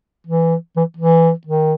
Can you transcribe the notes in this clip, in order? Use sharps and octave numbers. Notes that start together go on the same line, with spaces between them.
E3
E3
E3
D#3